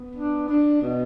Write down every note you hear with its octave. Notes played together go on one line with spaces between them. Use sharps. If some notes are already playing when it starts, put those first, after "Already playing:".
Already playing: B3
D4
D4
B2